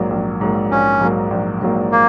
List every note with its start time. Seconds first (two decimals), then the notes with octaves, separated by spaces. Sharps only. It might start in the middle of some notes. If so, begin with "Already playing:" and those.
Already playing: A#1 G#2 F#3 A#3
0.10 A#1
0.41 G#2 F#3 A#3
0.71 A#1 C#4
1.01 G#2 F#3 A#3
1.31 A#1
1.61 G#2 F#3 A#3
1.92 A#3